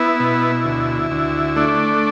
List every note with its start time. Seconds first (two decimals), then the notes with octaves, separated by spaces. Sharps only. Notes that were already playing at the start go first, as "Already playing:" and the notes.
Already playing: B3 E4
0.20 B2
0.65 D2
1.11 D2
1.56 A3 D4